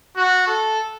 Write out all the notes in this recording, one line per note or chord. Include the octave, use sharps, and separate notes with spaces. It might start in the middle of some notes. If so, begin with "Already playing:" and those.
F#4
A4